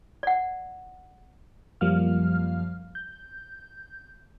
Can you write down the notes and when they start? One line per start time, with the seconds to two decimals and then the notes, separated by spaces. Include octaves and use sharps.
0.23 D5 F#5
1.81 F#2 F3 G3 A#3 F5 F6
2.95 G6